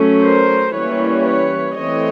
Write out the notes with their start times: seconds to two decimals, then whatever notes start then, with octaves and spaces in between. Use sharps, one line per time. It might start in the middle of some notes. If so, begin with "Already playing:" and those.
Already playing: F#3 A3 C#4
0.23 A#4 C5
0.74 E3 G3 A#3 C#4 B4 C#5
1.25 B4 C#5
1.76 E3 A3 C4 C#5 D#5